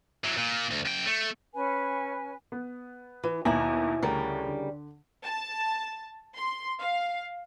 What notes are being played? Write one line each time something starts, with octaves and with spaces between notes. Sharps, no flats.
E3 F#3
A#2
D2
F#2 G5
A3
C#4 B4 G#5
B3
E3
D#2 B2 E4 G#5 A#5
D2 C#3 G3 A#4
D3
A5
C6
F5